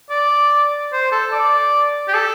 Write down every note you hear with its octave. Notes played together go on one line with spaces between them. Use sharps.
D5
C5
A4
D5
G4
A4